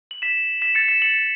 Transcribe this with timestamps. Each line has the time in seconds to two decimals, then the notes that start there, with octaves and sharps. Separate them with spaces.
0.11 F#7
0.22 B6 E7
0.61 B6 E7
0.75 A6 C#7
0.88 B6 E7
1.02 C#7 F#7